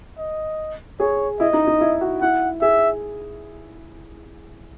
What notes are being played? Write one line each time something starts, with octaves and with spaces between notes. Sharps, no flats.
D#5
G#4 C#5
E4 D#5
D#4
D#4
E4
F#4
E4 F#5
G#4 E5